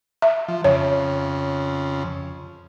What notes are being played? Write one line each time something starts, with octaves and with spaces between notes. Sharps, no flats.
E5
F3
F2 C#3 C#5